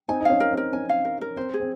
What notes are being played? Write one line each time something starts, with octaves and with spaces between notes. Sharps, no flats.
C4 D#4 G#5
D#4
C#4 F5
A#4
C4
A#4
C#4 G#5
F5
A#4
A#4
C4 C5
G#4
C4